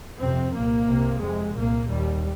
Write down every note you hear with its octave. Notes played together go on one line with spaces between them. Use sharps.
F2 C3 C4
C2 A#2 A#3
C2 C3
F2 C3 G#3
C2 A#2 A#3
D#2 G3